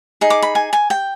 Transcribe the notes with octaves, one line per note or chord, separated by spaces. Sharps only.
D#4 G#4
D6
B5
G#5
G#5
G5